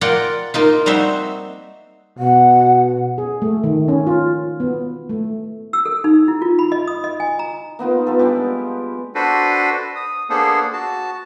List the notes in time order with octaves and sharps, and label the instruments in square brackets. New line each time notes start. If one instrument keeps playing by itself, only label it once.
[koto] F4 A#4 D5 F#5 G5
A#3 D#4 F4
G3 C4 D#4 F#4 C5 E5
[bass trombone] B2 [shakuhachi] F#5
[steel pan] G#4
A3
D#3
C#4
F4
B3
A3
[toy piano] E6
A4
D#4
E4
F4
B5
D#5
D#6
D#5
G#5
A#5
[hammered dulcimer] A#3 B3 D#4 F4
B3 F4 G4 A4
G3 G#3 D4 G4
[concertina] D4 F#4 A4 B4 C5
D#6
A#3 B3 D4 G#4 A4 C5
F#4 A5